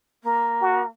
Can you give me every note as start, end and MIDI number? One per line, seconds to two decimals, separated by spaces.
0.23 0.86 58
0.61 0.82 66